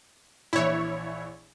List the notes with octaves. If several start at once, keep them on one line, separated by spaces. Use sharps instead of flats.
A#1 E3 E4 C#5